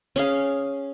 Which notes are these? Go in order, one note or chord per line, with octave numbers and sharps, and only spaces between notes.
C#4 G#4 F5